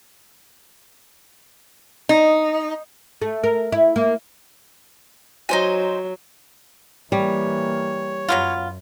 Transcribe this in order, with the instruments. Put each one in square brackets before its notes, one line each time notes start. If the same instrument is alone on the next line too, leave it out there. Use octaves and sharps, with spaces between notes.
[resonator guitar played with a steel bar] D#4
[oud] A3
A#4
E4
A#3
[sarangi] F#3 [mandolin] D#4 C5 G#5
[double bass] E3 A#3 [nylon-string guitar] G3 [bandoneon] C#5
[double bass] F#2 [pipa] F#3 B3 F4